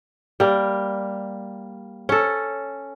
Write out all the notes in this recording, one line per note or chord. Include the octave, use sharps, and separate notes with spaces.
G3 A#3
C#4 A4